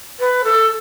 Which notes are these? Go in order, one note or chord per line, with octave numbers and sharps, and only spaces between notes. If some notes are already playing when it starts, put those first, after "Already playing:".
B4
A4